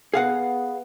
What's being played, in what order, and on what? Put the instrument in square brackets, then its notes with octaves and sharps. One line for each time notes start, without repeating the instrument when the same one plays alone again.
[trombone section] B3 [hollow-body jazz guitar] G#4 F5 F#5